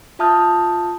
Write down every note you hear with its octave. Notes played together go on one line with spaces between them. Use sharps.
F4 E5 A5 D#6 F6 G6